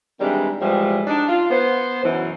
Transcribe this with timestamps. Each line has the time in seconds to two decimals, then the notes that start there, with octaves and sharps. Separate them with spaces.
0.20 D#3 E3 G3 G#3 C4 D4
0.61 A2 E3 F3 G3 G#3
1.07 D4 D#4
1.29 F4
1.51 B3 C5
2.04 F#2 B2 E3